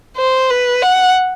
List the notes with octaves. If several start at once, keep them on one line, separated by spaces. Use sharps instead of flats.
C5
B4
F#5